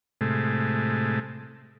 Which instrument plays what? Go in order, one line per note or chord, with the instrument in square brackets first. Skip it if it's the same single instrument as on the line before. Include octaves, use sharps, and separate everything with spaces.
[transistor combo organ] A2 C3 G#3 A3